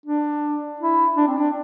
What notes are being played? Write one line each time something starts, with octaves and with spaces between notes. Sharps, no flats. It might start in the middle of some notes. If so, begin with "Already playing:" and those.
D4
E4
D4
C4
D4